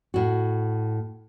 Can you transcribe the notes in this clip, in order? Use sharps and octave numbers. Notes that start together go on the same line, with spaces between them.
A2 F#4